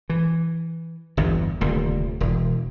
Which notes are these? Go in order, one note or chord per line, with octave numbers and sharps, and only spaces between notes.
E3
G1 E2 G2
D#1 D2 C3
E1